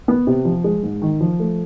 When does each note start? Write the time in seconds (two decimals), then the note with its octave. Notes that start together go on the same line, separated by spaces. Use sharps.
0.08 B3
0.27 C3
0.45 F3
0.64 G#3
0.83 G#2
1.02 D#3
1.21 F3
1.40 A3